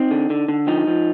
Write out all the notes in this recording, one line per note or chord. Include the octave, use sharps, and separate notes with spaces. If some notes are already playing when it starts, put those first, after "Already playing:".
Already playing: C4 D#4
D3
D3
D3
F3 D#4
F3